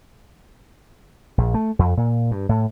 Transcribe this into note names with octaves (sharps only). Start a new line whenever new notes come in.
A#1
A3
F2
A#2
G2
A2